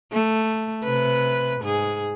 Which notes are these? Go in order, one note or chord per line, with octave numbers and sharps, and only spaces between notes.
A3
C3 B4
G#2 G#4